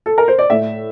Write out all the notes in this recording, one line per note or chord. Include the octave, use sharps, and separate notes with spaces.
A4
A#4
C5
D5
A2 E5